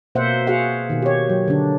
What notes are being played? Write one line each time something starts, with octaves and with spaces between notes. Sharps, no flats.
B2 A#3 C5 E5 F#5
F#4 G#4 A#4 F5 F#5
B2 D#3
G4 C#5
F#3
D3 D4